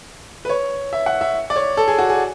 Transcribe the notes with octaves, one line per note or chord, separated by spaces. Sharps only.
B4
C#5
E5
F#5
E5
D5
C#5
A4
G#4
F#4
G#4